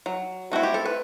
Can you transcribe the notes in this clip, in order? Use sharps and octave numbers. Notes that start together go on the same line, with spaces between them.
F#3
A3 C4 E4 F#4
G4
A4
B4